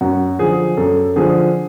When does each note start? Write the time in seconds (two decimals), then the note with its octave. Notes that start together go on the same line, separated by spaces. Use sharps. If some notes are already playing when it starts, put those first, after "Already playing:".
0.01 F#2 F#4
0.39 D3 F3 G#4
0.77 F#2 A4
1.16 D3 F3 G#4